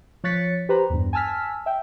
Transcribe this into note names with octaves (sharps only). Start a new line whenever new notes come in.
F3 C#5 F#6 A6 B6 C#7
G4 B4 C5 A#5 B5
E2 G2
G#5 A5 E6 F6 B6
E5 G5